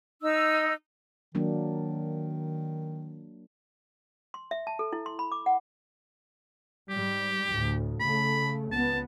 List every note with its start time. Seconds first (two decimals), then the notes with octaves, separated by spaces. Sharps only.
0.22 D#4 E6
1.35 D#3 F#3 A#3 D4
4.34 C6
4.51 E5
4.67 A5
4.79 A4
4.93 E4
5.06 C6
5.19 B5
5.32 D6
5.46 F#5
6.90 G#2 G3 G4
7.51 D2 A2
8.00 C#3 A3 B5
8.72 C#2 B3 A5